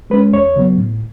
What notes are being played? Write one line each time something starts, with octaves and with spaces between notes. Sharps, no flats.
G#3 C#4 B4
E2 C#5
C#3 F#3 B3
A2